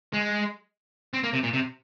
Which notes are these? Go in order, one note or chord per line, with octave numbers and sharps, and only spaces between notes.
G#3
C4
A#3
C3
A#2
C3